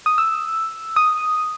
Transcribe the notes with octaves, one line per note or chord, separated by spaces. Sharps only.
D#6
E6
D#6